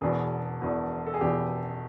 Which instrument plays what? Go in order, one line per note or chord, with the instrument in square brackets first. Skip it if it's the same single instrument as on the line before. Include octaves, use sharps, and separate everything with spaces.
[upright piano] E1 E2 B2 G#4
E1 E2 B2
A4
G#4
E1 E2 B2 G4